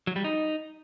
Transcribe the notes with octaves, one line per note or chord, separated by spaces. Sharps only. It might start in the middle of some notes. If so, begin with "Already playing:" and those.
F#3
G3
D#4